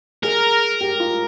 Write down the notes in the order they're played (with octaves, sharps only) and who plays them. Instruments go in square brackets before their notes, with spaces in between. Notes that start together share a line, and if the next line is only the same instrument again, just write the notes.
[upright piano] G#4 [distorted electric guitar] A#4
[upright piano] G4
F4